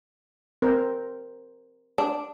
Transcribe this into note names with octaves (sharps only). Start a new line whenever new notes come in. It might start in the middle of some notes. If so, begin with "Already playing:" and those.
C4 A#4 C5
D4